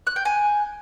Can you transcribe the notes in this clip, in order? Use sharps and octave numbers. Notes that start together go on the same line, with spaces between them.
F#6
G5
G#5